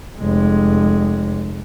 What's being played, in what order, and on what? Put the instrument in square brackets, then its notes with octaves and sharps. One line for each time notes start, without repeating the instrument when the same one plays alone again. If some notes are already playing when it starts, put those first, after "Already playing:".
[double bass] F1 G#3